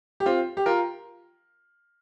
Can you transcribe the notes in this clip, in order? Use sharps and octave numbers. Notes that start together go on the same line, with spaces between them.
G4
C4 F4
G4
F4 A#4